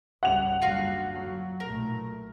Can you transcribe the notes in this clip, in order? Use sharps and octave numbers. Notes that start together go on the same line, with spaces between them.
G#1 C#2 G3 F#5 F7
F#1 D3 G3 F4 F#4 F5
F#3
B1 A#2 A3 A#4